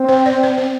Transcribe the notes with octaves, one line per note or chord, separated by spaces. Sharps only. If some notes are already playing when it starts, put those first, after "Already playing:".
Already playing: C4
C5
D5
C5
C5